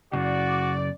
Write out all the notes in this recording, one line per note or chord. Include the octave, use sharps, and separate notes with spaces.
F#2 C#3 F#4 D5